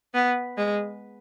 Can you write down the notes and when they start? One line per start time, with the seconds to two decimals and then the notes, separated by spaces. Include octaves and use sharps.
0.14 B3
0.57 G#3